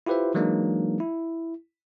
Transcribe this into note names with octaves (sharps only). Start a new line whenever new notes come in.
E4 F4 G4 B4 C5 E5
E3 F#3 G#3 A#3 D4 D#4
E4